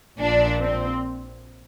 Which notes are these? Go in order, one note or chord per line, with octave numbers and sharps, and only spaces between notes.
A#1 A#2 D4
C4